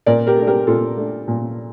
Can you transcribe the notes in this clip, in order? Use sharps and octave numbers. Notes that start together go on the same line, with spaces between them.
A#2 A#4 D5
G4 A#4
A3
D4
G4 A#4
A#2 F4 A4
A3 D4
A#2